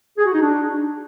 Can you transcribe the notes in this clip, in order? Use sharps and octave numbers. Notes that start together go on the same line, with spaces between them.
G#4
F#4
D#4
D4